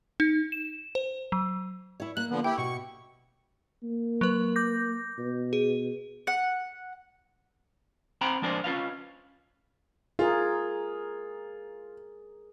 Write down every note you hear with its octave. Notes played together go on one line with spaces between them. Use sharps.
D#4
E7
C5
F#3
E4 C#5
A#3 F#6 F#7
D3 F3 B3
E4 G4 G5
B2 C#6
A#3
F#3 B4
D6 G6 A#6
B2
G#4
F#5
C4 C5 G5 A#5 B5
F3 G#3 D4 A#4 C5 D5
C#4 F4 B4 F5
F4 G#4 A#4